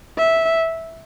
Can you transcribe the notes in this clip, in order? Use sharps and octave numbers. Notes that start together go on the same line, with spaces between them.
E5